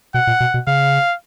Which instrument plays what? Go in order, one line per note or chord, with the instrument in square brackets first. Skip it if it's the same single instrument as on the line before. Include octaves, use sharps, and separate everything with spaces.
[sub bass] B2 [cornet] F#5
[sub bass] A#2
B2
B2
[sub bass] C#3 [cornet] F5